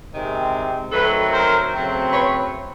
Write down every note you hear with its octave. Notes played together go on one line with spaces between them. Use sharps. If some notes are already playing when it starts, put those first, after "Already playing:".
C3 D#3 G#3 C4
D#3 F#3 A3 C4 A4 B4
A#4 C5
C#3 F#3 A3 C4
B4 C#5